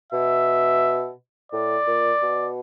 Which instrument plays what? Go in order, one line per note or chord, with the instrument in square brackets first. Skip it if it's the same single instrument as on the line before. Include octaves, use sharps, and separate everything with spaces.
[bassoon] B2 [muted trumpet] E5
[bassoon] A2 [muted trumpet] D5
[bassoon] A#2
B2